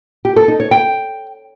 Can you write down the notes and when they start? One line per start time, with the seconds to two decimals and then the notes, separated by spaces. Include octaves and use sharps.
0.25 G4
0.36 A4
0.48 D#4
0.60 C#5
0.71 G5